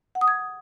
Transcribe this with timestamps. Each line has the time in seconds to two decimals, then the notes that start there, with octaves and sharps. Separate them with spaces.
0.15 F#5
0.21 D#6
0.28 G#6